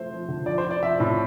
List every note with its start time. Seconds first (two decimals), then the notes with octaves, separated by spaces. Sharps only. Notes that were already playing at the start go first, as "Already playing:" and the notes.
Already playing: F3 A3 C5
0.11 F3
0.29 D3
0.46 F3 D5
0.58 C5
0.64 F3
0.71 D5
0.83 F3 E5
1.00 A2